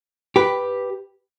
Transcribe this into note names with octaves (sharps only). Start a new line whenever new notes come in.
G4 B4